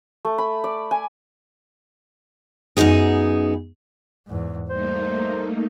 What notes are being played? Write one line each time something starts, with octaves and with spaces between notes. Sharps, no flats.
A3
B5
D5
G#5
F#2 B3 D#4 G4 G#4
E2 G#2
G3 A3 A#3 D#4 C5